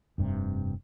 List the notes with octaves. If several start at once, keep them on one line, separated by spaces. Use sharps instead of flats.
F1 G2 C3